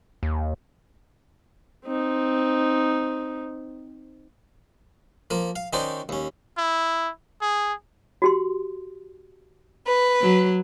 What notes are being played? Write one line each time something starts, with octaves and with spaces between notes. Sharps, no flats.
D#2
C4 D#4
F3 A#3 A#4
F5
D#3 C#4 D#4 F#4 C5 D5
D#2 C#4
E4
G#4
F#4 G4 C6
B4
F#3